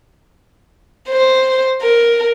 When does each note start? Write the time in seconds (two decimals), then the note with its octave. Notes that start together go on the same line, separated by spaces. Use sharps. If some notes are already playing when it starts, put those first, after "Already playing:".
1.09 C5
1.82 A#4